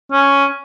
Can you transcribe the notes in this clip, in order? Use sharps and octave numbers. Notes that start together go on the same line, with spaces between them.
C#4